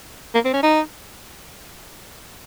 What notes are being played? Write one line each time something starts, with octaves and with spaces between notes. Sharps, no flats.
A#3
C4
C#4
D#4